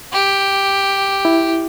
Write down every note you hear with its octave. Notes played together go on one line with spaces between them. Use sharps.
G4
E4